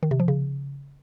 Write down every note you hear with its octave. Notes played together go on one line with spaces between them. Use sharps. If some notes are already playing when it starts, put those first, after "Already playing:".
D#3
C3
F3
C#3